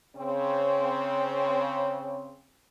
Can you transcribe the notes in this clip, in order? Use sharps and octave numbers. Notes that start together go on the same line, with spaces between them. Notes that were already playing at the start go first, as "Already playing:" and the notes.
C#3 C4 C#5